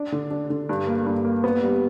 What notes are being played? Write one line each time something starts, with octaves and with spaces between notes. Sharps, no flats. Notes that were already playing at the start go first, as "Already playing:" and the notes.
Already playing: D4
D3
D4
D3
G2
A#3
G2
A#3
B3
G3